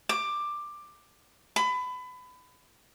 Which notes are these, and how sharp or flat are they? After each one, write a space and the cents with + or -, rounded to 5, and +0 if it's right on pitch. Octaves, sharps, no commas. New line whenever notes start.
D6 +10
B5 +25